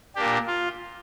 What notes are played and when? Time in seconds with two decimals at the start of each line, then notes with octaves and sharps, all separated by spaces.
0.16 A#2 A#3 D4 G4
0.46 F4